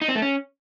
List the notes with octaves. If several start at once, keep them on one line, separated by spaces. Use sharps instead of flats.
D#4
C4
A3
C#4